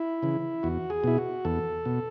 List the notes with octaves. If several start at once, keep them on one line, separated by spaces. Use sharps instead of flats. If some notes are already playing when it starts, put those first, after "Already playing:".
Already playing: E4
C#3 E3
E2 F#4
G#4
B2 E4
F#4
E2 A4
B2